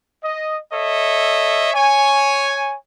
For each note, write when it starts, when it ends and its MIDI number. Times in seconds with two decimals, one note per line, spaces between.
0.23 0.57 75
0.72 1.70 69
0.72 1.70 73
0.72 1.70 75
0.72 1.70 76
1.73 2.75 73
1.73 2.75 80